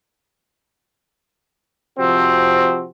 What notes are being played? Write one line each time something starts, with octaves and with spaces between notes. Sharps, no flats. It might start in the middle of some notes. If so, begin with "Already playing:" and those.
C3 F3 C4 F#4